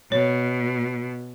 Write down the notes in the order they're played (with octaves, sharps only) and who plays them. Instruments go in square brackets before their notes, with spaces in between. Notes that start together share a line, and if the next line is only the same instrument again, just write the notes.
[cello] B2 [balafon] C#5